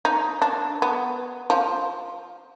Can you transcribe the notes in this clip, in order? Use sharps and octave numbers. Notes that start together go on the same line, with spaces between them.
D#4
D4
B3
F3